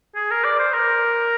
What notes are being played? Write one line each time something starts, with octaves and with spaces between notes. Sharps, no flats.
G#4
A#4
D5
C5
A#4